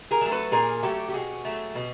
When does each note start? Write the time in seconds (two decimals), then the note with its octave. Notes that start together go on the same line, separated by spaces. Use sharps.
0.11 G#4 A#4
0.21 F#3 A3
0.31 A4 B4
0.52 A#2 G#4 A#4
0.83 F#3 A3 G4 A4
1.09 G4
1.14 B2 F#4 G#4
1.45 F#3 A3
1.75 B2